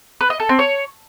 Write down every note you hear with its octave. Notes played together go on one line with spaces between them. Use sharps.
B4
D#5
A4
C4
C#5